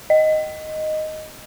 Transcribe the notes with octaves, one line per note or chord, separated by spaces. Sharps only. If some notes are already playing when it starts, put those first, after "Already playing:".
D#5